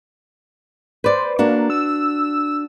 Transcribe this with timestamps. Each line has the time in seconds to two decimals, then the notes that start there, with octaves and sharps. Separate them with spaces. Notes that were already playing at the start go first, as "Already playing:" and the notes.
1.04 B4 C5 D5
1.39 A#3 D4 F#4
1.70 E6